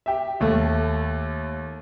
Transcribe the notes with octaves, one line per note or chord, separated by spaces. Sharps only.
G4 E5
D#2 A3 A4